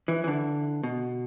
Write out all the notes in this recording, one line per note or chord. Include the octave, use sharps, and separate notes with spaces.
E3
E3
D3
B2